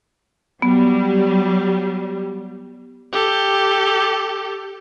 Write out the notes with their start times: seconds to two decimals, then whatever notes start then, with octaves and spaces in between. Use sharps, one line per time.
0.62 F#3 G3 B3
3.12 G4 A4